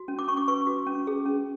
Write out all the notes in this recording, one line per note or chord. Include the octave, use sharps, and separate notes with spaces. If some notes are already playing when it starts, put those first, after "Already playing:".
Already playing: F#4
C#4
D6
C#4 C#6
D6
B4 C#6
F#4
C#4
G#4
C#4